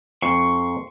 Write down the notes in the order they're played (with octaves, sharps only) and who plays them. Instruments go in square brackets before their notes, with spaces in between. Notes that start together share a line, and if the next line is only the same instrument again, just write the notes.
[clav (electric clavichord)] F2 [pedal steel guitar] C6 C#6